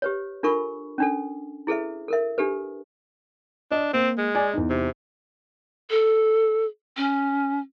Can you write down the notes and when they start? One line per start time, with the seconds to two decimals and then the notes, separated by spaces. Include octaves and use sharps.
0.02 G4 B4 C#5
0.43 D4 F4 A4 A#4 B5 C#6
0.98 C#4 D4 A4
1.67 E4 G#4 A4 B4 E5
2.08 A4 A#4 E5
2.38 D4 G4 A4 B4
3.72 D4 D#5
3.94 A#3 C4
4.18 G#3
4.35 D5 G#5
4.54 E2 D#4
4.70 C3
5.90 A4
6.97 C#4